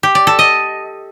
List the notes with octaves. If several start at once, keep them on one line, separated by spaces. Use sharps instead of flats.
G4
D5
A4
D#5